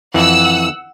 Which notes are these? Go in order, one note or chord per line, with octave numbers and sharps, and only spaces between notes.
F2 E3 F#5 E6